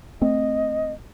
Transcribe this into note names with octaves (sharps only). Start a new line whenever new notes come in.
A3 C4 D#5